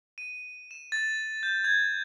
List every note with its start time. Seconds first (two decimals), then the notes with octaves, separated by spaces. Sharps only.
0.18 D#7
0.71 E7
0.92 A6
1.43 G6
1.64 G#6